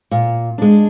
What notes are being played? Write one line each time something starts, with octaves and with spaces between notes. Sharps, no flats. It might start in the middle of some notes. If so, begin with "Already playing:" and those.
A#2
G#3 D4